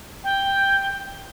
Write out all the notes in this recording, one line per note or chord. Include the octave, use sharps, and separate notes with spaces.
G5